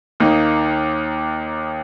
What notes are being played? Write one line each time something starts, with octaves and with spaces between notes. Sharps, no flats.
D#2 D#3 A#3 D#4